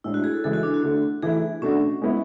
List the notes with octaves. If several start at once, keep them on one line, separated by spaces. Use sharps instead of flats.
A2 G#3 D4 E4
F#4
G#4
A4
C#3 E3 G#3 A4
F#4
D4
F#4
D3 A3 D4
E3 A3 E4 G#4
B2 A3 C#4 D4 F#4
G#3 B3 E4